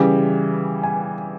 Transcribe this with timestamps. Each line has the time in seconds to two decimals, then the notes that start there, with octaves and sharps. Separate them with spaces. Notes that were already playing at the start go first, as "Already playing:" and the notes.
Already playing: C#3 E3 G3
0.83 G#5